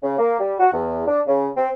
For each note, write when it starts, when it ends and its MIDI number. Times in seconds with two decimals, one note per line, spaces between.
0.02 0.17 49
0.18 0.36 58
0.39 0.54 55
0.59 0.69 66
0.72 1.03 40
1.07 1.19 62
1.27 1.47 49
1.57 1.70 60